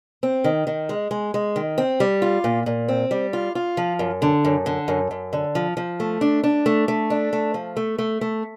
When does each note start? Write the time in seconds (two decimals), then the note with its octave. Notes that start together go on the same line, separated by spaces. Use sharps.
0.23 C4
0.44 D#3
0.67 D#3
0.89 G#3
1.11 G#3
1.34 G#3
1.56 D#3
1.78 C4
2.00 G3
2.22 F4
2.44 A#2
2.66 A#2
2.88 C4
3.11 G3
3.33 F4
3.55 F4
3.77 F3
3.99 F#2
4.22 D3
4.45 F#2
4.66 D3
4.88 F#2
5.11 F#2
5.33 D3
5.55 F3
5.77 F3
6.00 A3
6.21 D4
6.44 D4
6.66 A3
6.88 A3
7.10 D4
7.33 A3
7.54 F3
7.77 A3
7.98 A3
8.21 A3